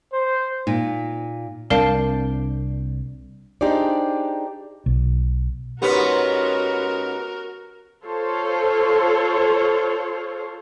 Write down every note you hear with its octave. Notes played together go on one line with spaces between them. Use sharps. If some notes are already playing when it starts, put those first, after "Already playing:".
C5
A#2 D#4
C2 C4 D4 A#4 D5 F5 A5
D4 D#4 G4 G#4 C5 D5
B1
G#2 B3 C#4 F#4 G4 A#4 B4 B6
F4 A4 C5 C#5